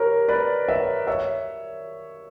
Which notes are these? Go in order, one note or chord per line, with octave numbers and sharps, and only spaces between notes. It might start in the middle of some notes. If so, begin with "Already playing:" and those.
Already playing: G4 A#4 B4 C#5
B4 D5
C#5 E5
C#5 E5